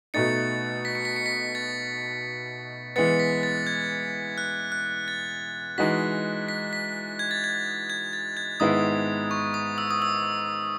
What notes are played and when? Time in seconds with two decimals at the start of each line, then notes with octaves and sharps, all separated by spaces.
0.14 B2 A3 D#4 A6 C#7
0.85 B6
0.95 C#7
1.05 B6
1.16 C#7
1.26 B6
1.55 A6
2.96 E3 G#3 B3 A6 C#7
3.19 B6
3.43 A6
3.67 G#6
4.38 F#6
4.72 F#6
5.08 A6
5.78 E3 G#3 D#4 F#4 B6
6.48 B6
6.73 B6
7.19 G#6
7.31 A6
7.44 G#6
7.90 G#6
8.13 A6
8.37 G#6
8.60 G#2 D#3 G#3 B3 E4 D#6
9.31 C#6
9.54 D#6
9.78 E6
9.91 D#6
10.02 E6